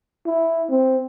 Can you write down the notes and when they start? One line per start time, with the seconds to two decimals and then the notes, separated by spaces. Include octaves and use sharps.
0.26 E4
0.70 C4